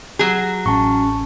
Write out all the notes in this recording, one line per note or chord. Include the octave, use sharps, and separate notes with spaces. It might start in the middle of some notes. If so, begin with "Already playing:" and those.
F#3 G#4
A1 C#4 A5 C#6